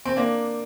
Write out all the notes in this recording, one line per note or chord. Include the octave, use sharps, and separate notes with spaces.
C4
A#3 D4